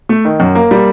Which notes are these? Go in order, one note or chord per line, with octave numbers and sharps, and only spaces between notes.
A3
D#3
F#2
A#3
G3